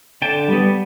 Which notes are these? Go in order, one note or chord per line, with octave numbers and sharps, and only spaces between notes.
D3 G5 A5
G3 B3